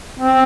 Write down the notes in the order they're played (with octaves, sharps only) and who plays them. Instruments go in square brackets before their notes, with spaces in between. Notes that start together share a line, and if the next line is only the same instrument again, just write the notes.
[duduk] C4